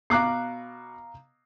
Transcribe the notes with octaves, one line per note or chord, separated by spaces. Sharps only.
B2 F5 A#5 D6 F#6 C7